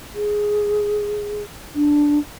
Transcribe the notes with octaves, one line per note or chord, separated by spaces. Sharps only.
G#4
D4